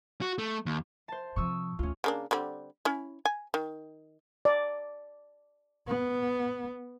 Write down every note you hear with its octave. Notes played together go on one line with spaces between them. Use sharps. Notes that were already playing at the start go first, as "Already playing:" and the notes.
F#4
A3
D#2
C5 A5
C3 F3 C#6 D#6 E6
D2 D#3 C#4 F4
C#3 A#3 D4
D3 G3 C4
C#4 E4
G#5
D#3
D5
B3